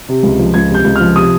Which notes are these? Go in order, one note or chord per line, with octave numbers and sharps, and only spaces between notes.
C3
C#2
F3
C#2 G#6
C3
G6
C#2
F3 F6
C3 D#6